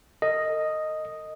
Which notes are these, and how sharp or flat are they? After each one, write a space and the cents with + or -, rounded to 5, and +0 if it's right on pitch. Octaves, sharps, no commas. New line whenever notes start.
A#4 -45 D#5 +0